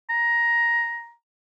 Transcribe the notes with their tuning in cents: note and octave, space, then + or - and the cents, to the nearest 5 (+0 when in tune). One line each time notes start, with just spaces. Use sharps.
A#5 +10